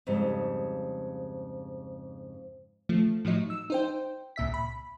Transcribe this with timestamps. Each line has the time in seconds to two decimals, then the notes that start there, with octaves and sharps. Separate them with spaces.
0.07 F2 G#2 C#3 G3
2.89 F3 A3
3.25 A2 F3 F#3 D#4
3.50 E6
3.70 D#4 C5 G5
4.36 C#2 A#2 E5 B6
4.54 B5